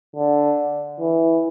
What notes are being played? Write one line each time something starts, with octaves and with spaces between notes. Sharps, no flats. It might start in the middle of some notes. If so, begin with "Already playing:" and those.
D3
E3